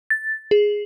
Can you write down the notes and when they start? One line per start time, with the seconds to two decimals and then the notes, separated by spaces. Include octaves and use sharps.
0.10 A6
0.51 G#4